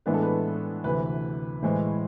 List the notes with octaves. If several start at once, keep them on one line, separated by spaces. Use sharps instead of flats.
A2 E3 G#3 B3 D4 B4
A4
B4
D2 C3 E3 B4
A2 E3 G#3 C5